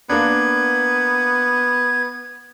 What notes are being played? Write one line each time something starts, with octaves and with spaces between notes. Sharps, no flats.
A#3 B3 D4 G#6